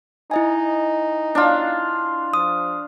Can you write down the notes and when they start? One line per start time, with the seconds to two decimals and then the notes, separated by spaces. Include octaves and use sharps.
0.31 D#4 E4 D#5 G#5
1.35 D4 F4
2.34 F3 D#6